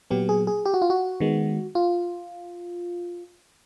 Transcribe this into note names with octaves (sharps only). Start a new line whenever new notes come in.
A#2 F#3 B3 G4
G#4
G#4
G4
F#4
F4
F#4
D#3 G#3 B3
F4